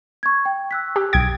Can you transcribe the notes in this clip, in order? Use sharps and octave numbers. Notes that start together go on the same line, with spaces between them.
C#6 G#6
G5
E6 F#6 B6
G4
B1 G5 D#6 G#6 D7